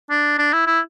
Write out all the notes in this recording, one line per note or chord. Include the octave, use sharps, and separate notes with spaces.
D4
D4
E4
E4